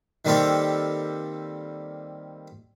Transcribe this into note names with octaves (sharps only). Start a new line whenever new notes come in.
D#3 G3 A#3 C4 G4 A4